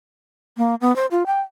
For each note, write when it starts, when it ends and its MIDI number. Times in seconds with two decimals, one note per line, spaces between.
0.57 0.75 58
0.81 0.94 59
0.96 1.06 72
1.11 1.26 65
1.26 1.40 79